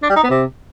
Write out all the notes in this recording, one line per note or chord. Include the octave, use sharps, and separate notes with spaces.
D4
G3
D#4
B3
C3